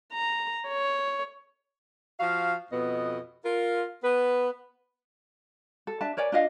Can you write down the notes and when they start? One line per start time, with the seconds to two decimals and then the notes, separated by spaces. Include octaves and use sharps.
0.13 A#5
0.69 C#5
2.20 F3 F#4 F5
2.71 F2 B2 B3 D#5
3.44 F4 A#4
4.03 B3 B4
5.87 A4
6.01 D4 E5 A5
6.17 A#4 C#5 D5 G#5
6.32 D4 F4 D#5 F5